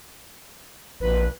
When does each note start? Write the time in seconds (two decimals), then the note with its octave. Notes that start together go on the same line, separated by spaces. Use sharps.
1.00 A#1 B4